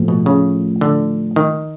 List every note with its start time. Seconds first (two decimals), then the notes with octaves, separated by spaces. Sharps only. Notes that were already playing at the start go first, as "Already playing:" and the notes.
Already playing: A2 F3 A3
0.08 B2
0.26 C#3
0.81 D3
1.36 D#3